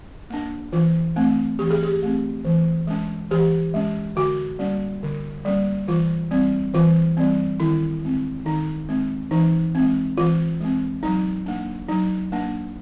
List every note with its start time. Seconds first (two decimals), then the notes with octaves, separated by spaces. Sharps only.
0.30 A#3 D4
0.73 E3 F4
1.16 A3 C4
1.59 E3 G4
1.71 G#4
1.83 G4
2.03 A3 C4
2.45 E3
2.87 G#3 C#4
3.31 E3 G4
3.74 G#3 C#4
4.16 D3 F#4
4.59 G3 A#3 C#4
5.03 D3
5.45 G3 A#3 C#4
5.88 E3 F4
6.31 G3 C4
6.74 E3 F4
7.17 G3 C4
7.60 D#3 E4
8.03 G#3 C4
8.46 D#3 D#4
8.89 G#3 C4
9.31 E3 D#4
9.75 G#3 C4
10.18 E3 F4
10.60 G#3 C4
11.03 F#3 D#4
11.46 A#3 D4
11.88 F#3 D#4
12.32 A#3 D4